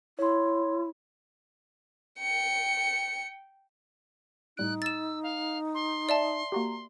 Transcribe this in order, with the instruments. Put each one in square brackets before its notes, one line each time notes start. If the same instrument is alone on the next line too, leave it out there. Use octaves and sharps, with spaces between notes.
[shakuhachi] E4 [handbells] C#5 C6
[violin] G5 C#7
[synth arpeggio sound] A2 G3 D7 [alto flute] D#4 [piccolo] F#6
[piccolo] E6 [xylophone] A6 E7
[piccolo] F5
C6
[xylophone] D5 E5 A5
[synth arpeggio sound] A#3 F#4 G4 [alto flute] A#5